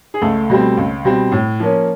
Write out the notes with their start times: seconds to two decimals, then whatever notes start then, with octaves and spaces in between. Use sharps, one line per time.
0.14 G#4
0.21 C#2 A3 A4
0.50 B2 G3 C4
0.77 C#2
1.05 B2 G3 C4
1.32 A2
1.60 F3 A#3 C#4